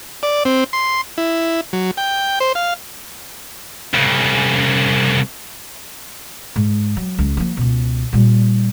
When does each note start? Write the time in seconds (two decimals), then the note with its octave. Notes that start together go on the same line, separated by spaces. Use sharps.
0.23 D5
0.45 C4
0.73 C6
1.18 E4
1.73 F#3
1.97 G5
2.40 C5
2.55 F5
3.94 C2 C#3
6.56 G#2
6.97 F#3
7.18 C#2
7.37 F3 A#3
7.57 C#2 B2
8.13 A#2 G3